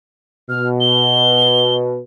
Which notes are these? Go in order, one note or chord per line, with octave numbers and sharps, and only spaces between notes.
B2 F6
G7